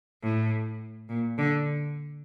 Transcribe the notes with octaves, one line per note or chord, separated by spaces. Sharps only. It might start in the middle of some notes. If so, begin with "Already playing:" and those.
A2
A#2
D3